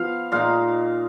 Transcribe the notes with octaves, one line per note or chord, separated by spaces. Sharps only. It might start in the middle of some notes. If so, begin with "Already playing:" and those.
Already playing: F3 B3 F5
A#2 G#3 D#4 F5